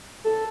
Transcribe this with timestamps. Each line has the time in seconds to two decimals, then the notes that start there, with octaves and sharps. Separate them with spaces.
0.24 A4